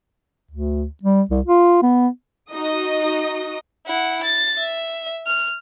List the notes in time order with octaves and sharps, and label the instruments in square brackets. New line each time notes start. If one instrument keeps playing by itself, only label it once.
[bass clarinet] D2
G3
C2
F4
B3
[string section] D#4 F#4 D#5 D#6
[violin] E4 F#5
A6
E5
F6